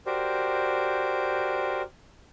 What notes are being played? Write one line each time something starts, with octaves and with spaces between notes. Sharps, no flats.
F#4 G4 A#4 C5 D5